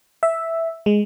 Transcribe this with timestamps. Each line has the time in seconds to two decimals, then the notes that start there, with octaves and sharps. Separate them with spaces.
0.23 E5
0.86 G#3